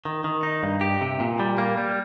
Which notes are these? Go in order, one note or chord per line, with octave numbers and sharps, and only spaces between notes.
D#3
D#3
D#4
G2
G4
C3
A#2
G3
A#3
G3